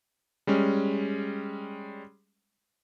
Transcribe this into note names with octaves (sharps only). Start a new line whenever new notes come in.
G3 G#3 C#4